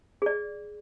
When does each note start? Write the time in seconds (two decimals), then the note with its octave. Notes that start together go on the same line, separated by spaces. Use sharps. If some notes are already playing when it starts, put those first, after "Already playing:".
0.22 G#4 D5